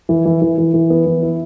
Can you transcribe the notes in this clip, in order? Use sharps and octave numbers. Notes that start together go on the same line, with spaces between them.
E3
E3
E3
E3
E3
B3
E3
E4